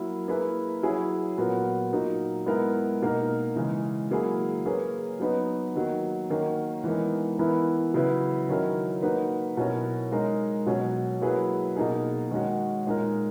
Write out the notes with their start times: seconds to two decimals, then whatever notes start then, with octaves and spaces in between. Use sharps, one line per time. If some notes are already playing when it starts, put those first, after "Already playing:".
Already playing: F#3 A#3 E4 A#4
0.28 A#3 E4 G#4 B4
0.83 F#3 C#4 E4 G#4
1.37 A#2 F#3 B3 F#4 A#4
1.93 A#2 F#3 A#3 D#4
2.46 G#3 B3 E4 A#4
3.02 B2 A#3 D#4 A#4
3.56 C#3 E3 G#3
4.11 F#3 A#3 E4 G#4
4.66 A#3 C#4 G#4 B4
5.20 F#3 B3 D#4 F#4 B4
5.76 D#3 F#3 A#3
6.30 D#3 A#3 C#4 F#4
6.84 E3 G#3 B3 D#4 A#4
7.39 E3 B3 E4 A#4
7.94 C#3 F#3 B3 E4 B4
8.49 D#3 F#3 C#4 E4 A#4
9.02 A#3 D#4 F#4 B4
9.57 B2 F#3 C#4 E4 A#4
10.12 G#3 D#4 A#4
10.66 B2 F#3 C#4
11.21 F#3 A#3 E4 G#4 B4
11.76 B2 A#3 D#4 G#4
12.31 D#3 G#3 C#4 F#4
12.85 A#2 G#3 D#4 A#4